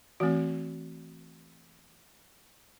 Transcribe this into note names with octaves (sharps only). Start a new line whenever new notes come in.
E3 A3 C4 F#4